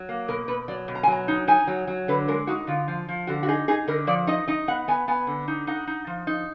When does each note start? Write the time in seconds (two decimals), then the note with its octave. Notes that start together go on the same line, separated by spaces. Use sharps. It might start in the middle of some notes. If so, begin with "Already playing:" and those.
Already playing: F#3
0.09 A#3
0.28 B2 A#4
0.48 B2 B4
0.68 F#3 D5
0.88 B2
0.95 A#5
1.03 G#5
1.08 F#3 A#5
1.28 D#4
1.47 D#4 G#5
1.67 F#3
1.87 F#3
2.08 D3 B4
2.28 G#3 A#4
2.47 D#4 F#4
2.67 D3 F4
2.88 F3
3.08 F3
3.27 D3 F#4
3.43 F#4
3.48 D#4 G#4
3.68 D#4 G#4
3.88 D3 A#4
4.07 F3 D5
4.27 D#4 D#5
4.47 D#4 D#5
4.68 B3 F#5
4.88 B3 G#5
5.08 B3 G#5
5.27 D3
5.48 D#4
5.67 D#4 F#5
5.87 D#4
6.07 F3
6.27 D#4